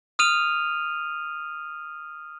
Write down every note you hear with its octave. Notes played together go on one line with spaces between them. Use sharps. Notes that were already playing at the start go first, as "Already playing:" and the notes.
D#6 F6 D#7 F7